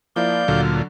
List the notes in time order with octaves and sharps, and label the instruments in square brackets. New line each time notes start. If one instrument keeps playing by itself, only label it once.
[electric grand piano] F3 A#3 E4 [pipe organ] D5 F5 G6
[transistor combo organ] D2 A#2 F4 [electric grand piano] D3 F#3 D4